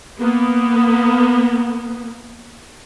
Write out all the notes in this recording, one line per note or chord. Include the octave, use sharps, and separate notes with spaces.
A#3 B3